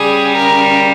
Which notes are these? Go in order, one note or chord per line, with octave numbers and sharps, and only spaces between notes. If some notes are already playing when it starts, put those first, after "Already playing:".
Already playing: C#3 G3 G#4
A#4